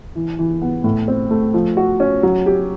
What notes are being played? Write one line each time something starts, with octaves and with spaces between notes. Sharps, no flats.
E3
E3
B3
A2
C4
A3
F3
F#4
C#4
F#3
G4